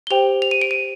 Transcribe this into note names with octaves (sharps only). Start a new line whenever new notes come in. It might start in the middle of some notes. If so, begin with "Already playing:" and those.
G7
G4 C5 G5 F7
F7
D#7
D7
D#7